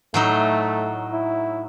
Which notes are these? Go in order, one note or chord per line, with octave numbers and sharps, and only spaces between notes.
A2 F#3 A3 D#4
E4